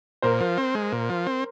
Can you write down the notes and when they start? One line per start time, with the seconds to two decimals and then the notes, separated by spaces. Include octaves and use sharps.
0.22 A#2 A#4 C5
0.40 F3
0.58 C4
0.75 G#3
0.92 A#2
1.09 F3
1.27 C4